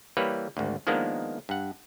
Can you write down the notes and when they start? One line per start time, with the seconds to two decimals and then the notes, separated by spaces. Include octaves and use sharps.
0.17 E3 G3 A#3 B4 C#5
0.57 G#1 D2
0.87 D#3 F3 G#3 A#3 B3 D4
1.49 G2 F#5